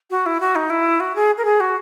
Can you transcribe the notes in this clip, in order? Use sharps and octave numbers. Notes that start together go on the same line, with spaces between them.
F#4
E4
F#4
D#4
E4
F#4
G#4
A#4
G#4
F#4